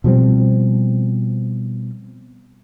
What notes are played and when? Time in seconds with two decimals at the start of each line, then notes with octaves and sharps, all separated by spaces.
0.04 B2 F3 G3 C4